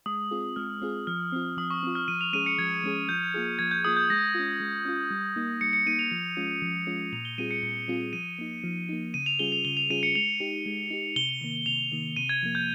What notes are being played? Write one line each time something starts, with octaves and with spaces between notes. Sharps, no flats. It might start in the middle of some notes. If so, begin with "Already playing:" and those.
G#3 D#6
C4 F4 G#4
G#3 F6
C4 F4 G#4
F3 F6
C4 F4
F3 D#6
C#6
C4 F4
F6
F3 D#7
F7
G#3 C#4 G#4 D#7
C#7
F3 G#6
G#3 C#4 G#4
F3 G6
A#3 F4 G#4
F3 G#6
G6
A#3 F4 G#4 D#6
G6
G#3 A#6
C#4 F4
G#3
C#4 F4
G3
A#3 D#4
G3 C#7
C#7
A#3 D#4 D#7
F7
F3
G#3 C#4 F4
F3
G#3 C#4 F4
A#2 F7
G7
G3 C4 F4 G#4 D#7
C#7
A#2 C#7
G3 C4 F4 G#4
F3 D#7
A#3 D#4
F3
A#3 D#4
C#3 D#7
F7
G3 C#4 F4 G#4 G7
F7
C#3 G7
F7
G3 C#4 F4 G#4 D#7
C#7
G#3 F7
D#4 G4
G#3
D#4 G4
C3 G7
D#3 A#3
C3 F7
D#3 A#3
C3 D#7
G#6
F3 A#3
G6